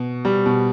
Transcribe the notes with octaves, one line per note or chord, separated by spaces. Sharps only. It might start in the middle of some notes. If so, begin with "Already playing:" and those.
Already playing: B2
G3
B2